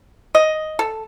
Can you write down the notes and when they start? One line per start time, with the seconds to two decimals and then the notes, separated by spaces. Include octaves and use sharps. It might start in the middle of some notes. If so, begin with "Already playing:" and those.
0.35 D#5
0.79 A4